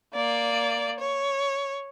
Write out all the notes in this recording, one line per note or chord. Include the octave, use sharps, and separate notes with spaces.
A#3 D5
C#5